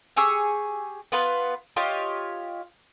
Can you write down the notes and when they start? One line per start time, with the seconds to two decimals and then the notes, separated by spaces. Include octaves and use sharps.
0.17 G4 G#4 C#6 E6
1.12 B3 F4 B4
1.76 F4 G4 C#5 D#5